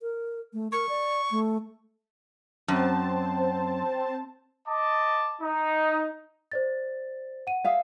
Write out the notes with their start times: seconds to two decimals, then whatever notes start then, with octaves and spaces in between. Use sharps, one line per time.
0.02 A#4
0.53 A3
0.72 A#4 C#6
0.89 D5
1.31 A3
2.68 F#2 C4 C5 A5
4.67 D#5 A5 D6
5.42 D#4
6.52 C5 D5 A6
7.47 F#5 D#7
7.64 G#4 E5 F5